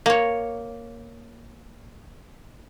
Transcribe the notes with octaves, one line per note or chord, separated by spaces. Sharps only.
A#3 C#5